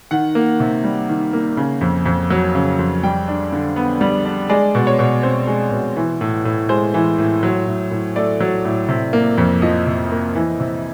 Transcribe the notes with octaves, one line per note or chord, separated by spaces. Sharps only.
D#3 F#5
A#3
C3
G3
D#3
A#3
C#3
F2
F2
F#3
C#3
F2
G3 G5
D4
D3
B3
G3
D4
G#3 D5
B2
C#5
B2
C4 C5
G#3
B2
E3
A2
A2
G#3 C5
E3
A2
F#3
A2
A2
A3 D5
F#3
A2
C3
A#3
F2
F3 D#5
C3
A#3
E3
C3